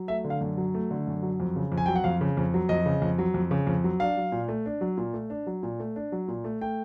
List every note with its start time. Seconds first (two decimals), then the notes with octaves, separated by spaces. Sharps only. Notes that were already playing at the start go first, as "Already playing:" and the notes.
Already playing: F#3
0.08 A3 E5
0.25 D3
0.30 F5
0.41 F#2
0.57 F#3
0.74 A3
0.91 D3
1.07 F#2
1.23 F#3
1.40 F2
1.56 C#3
1.72 F2
1.77 G#5
1.86 F#3 G5
1.96 F#5
2.04 F2 F5
2.21 C#3
2.37 F2
2.54 F#3
2.69 F2 D#5
2.86 C#3
3.02 F2
3.18 F#3
3.34 F2
3.51 C#3
3.67 F2
3.84 F#3
4.00 D4 F5
4.17 F#3
4.32 A#2
4.48 A3
4.66 D4
4.81 F#3
4.98 A#2
5.14 A3
5.30 D4
5.47 F#3
5.63 A#2
5.80 A3
5.96 D4
6.12 F#3
6.28 A#2
6.44 A3
6.61 A3 G5